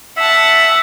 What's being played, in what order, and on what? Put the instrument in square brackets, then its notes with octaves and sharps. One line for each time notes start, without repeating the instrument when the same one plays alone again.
[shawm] E5 [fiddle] F#5 A5